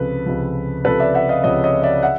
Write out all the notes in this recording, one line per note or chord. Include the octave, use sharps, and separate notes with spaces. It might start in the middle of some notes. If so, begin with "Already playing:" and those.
Already playing: C#2 C3 F3 A4 B4
C#2 C3 F3
C#2 C3 F3 A4 B4
D5 E5
E5 F#5
D#5 F5
C#2 C3 F3 C#5 D#5
C#5 D#5
D5 E5
E5 F#5